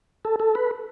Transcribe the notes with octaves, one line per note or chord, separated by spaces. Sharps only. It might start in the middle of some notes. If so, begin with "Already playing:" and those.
A4
A4
B4